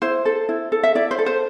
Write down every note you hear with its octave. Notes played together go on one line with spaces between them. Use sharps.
E4 C5
A4
E4
A4
E5
E4 D5
C5
A4
C5